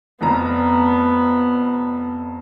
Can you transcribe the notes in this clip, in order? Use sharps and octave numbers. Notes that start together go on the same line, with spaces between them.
F1 F2 B3 A#5